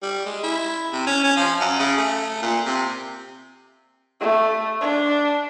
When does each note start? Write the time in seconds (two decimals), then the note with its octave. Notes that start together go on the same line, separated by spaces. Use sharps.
0.02 G3
0.25 G#3
0.43 E4
0.93 C3
1.07 C#4
1.24 C#4
1.37 F3
1.60 F#2
1.79 C#3
1.97 A3
2.42 A#2
2.66 C3
4.21 A3
4.81 D4